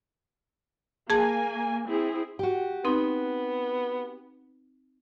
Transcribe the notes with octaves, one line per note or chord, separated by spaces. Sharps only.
A#3 G#4 G#5 A5
C4 E4 G#4
F#4 G4
B3 C4 D#4 C6